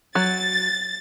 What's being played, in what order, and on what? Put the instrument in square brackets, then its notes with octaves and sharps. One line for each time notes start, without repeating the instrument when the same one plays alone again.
[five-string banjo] F#3 [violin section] A6